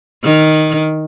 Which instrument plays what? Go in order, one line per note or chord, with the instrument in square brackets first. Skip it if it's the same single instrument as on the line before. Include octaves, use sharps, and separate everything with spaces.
[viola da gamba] D#3